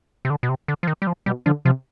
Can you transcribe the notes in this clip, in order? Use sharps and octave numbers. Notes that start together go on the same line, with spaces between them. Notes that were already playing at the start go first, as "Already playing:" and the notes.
C3
D3
B2
C3
D3
F3
D#3
G3
F3
B2 G3
D3 F3
C3 F3